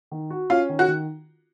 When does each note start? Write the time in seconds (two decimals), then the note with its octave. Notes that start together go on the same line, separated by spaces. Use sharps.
0.11 D#3
0.30 F#4
0.50 C#4 F4
0.69 D#3
0.79 F#4
0.88 D#3